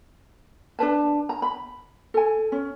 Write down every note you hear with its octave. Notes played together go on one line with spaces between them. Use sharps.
D4 A#4 B4 A5
A#5
B5
A4 G#5
C#4